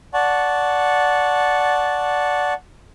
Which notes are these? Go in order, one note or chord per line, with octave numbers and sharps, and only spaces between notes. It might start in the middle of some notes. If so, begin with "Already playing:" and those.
D5 F#5 A5 C#6